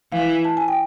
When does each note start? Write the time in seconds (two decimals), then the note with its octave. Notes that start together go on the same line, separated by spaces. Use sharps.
0.12 E3 F5
0.45 A5
0.57 G#5
0.68 G5